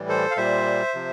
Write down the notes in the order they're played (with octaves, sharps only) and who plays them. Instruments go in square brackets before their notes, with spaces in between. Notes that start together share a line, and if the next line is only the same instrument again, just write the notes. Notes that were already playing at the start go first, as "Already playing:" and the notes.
Already playing: [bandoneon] A2 E3 G3
A4 C5
F5
A#2 G3 C5 E5
C3 F3